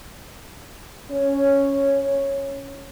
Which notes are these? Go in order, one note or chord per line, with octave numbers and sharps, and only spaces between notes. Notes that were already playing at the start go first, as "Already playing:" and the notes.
C#4 C#5